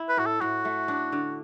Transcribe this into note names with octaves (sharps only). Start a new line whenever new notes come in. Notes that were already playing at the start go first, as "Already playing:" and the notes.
Already playing: E4
B4
A2 F#4
A4
A2 F#4
A3
D4
D3